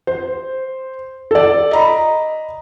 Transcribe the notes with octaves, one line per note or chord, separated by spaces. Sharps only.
C5
A4 D5
D#5 A#5 B5